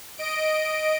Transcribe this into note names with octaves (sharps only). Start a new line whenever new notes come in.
D#5 D7